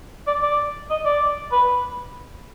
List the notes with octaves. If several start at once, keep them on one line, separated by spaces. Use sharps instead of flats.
D5
D5
D#5
D5
B4